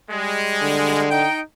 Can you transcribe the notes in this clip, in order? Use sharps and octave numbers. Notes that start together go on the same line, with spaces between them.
G3 G#3
D3
D#4 G5